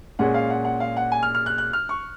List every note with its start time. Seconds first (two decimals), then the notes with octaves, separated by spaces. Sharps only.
0.19 A#2 G#3 C#4 F#5
0.34 F5
0.50 F#5
0.65 F#5
0.80 F5
0.96 F#5
1.12 G#5
1.23 F6
1.35 F6
1.46 F#6
1.58 F#6
1.73 F6
1.89 C#6